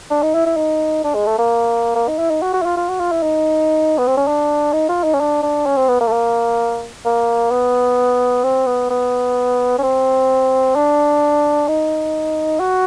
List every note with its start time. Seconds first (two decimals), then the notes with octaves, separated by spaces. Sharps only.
0.11 D4
0.23 D#4
0.35 E4
0.46 E4
0.57 D#4
1.04 D4
1.15 G#3
1.27 A3
1.38 A#3
1.96 A#3
2.08 D#4
2.19 E4
2.31 D#4
2.43 F#4
2.54 F#4
2.62 E4
2.66 F4
2.77 F4
2.89 F#4
3.00 F4
3.12 E4
3.23 D#4
3.98 B3
4.08 C4
4.17 C#4
4.28 D4
4.73 D#4
4.89 F4
5.04 D#4
5.14 C#4
5.21 D4
5.43 D4
5.66 C#4
5.77 C4
5.89 B3
6.01 A#3
6.08 A3
6.12 A#3
7.05 A#3
7.51 B3
8.45 C4
8.67 B3
8.91 B3
9.79 C#4
9.83 C4
10.76 D4
11.68 D#4
12.60 F#4